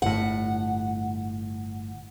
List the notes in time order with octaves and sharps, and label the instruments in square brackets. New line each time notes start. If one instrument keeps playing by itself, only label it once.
[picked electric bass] G1 A2 [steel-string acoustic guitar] F#5